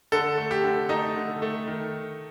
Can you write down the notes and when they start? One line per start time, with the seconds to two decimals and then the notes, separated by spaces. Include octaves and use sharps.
0.12 D3 A4
0.38 A3
0.51 G4
0.64 D3
0.89 A3 D#4
1.16 D3
1.42 A3
1.67 D#3